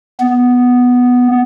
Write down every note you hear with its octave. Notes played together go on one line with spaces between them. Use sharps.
B3